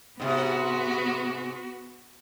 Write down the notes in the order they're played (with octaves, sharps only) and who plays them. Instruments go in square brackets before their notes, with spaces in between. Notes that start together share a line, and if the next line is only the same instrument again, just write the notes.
[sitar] G#2 C3 [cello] B3 F#4